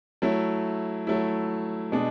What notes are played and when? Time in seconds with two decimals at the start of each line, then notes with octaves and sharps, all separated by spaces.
0.22 F#3 A3 E4
1.07 F#3 A3 E4
1.92 B2 G#3 D4